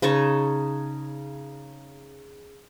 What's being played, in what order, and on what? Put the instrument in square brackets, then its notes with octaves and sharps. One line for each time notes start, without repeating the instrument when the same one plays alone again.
[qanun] C#3 D#4 A5 C#6